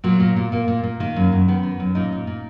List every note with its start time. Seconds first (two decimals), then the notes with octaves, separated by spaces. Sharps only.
0.04 A#2 F#3
0.20 A#2
0.36 A#2
0.52 A#2 A#3
0.68 A#2
0.84 A#2
1.00 D#3 A#3
1.16 F#2
1.32 F#2
1.48 D#3 B3
1.63 D#3
1.80 F#2
1.95 A#2 D#4
2.12 A#2
2.27 A#2